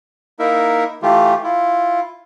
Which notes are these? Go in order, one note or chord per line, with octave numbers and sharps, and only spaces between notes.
A#3 D#4 E4 A#4 E5
E3 A3 F4 G4
E4 F4